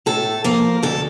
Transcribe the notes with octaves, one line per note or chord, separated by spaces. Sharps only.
A2 A4
F3 A#3 A#4
D2 A4